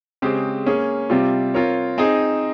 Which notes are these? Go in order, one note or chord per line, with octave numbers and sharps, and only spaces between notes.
C#3 G#3 C4 G4
A#3 C#4 G#4
C3 G3 C4 F4
C4 F4 A#4 C#5
C4 D#4 G#4 D#5